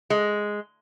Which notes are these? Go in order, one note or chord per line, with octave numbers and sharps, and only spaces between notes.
G#3